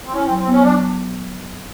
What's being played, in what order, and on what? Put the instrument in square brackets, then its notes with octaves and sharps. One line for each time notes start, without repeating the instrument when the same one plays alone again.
[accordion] C4
[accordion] C#4 [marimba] E4
[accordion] C4
[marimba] F#3
[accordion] C4
[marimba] B3 [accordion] C#4
[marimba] F#3 [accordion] D4